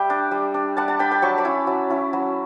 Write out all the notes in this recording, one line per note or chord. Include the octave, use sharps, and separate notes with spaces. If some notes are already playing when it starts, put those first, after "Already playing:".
Already playing: G3 E5 G5
D4
G3
D4
G3 F#5 A5
F#5 A5
D4 G5 B5
G5 B5
F#3 A5 C#6
B5 D6
C#4 E4
F#3
C#4 E4
F#3